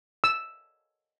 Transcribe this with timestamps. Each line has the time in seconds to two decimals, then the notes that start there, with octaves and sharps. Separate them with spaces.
0.24 E6